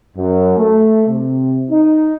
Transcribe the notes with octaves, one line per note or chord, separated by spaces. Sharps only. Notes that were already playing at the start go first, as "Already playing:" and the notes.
F#2
A3
C3
D#4